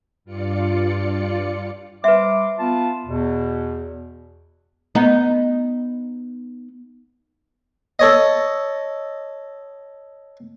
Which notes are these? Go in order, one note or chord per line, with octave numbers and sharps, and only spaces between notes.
G2 F4 D5 C#7
G3 B4 E5 C6 D6
B3 F4 A5
E2 B2
B3 D#4
A4 C#5 D#5